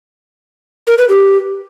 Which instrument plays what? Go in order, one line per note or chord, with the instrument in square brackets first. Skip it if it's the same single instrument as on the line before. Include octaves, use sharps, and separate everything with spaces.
[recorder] A#4
B4
G4